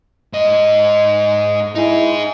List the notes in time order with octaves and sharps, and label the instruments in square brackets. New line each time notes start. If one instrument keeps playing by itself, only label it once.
[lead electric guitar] G#2 D#5
[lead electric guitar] D#4 G#4 [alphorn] E4